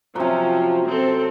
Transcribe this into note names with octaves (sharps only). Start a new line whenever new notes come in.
C3 F3 F#3 C#4
C4 A4